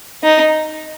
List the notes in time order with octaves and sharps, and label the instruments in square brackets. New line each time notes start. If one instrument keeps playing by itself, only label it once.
[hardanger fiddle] D#4